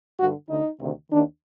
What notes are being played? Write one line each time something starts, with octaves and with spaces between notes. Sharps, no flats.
G2 D3 F#4
D2 D3 D#4
D2 C3 D#3
D#2 D#3 D4